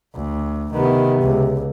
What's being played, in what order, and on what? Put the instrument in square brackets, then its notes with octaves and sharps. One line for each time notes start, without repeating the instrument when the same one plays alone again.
[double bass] D2
[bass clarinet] C3 [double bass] D#3 B3
[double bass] C#2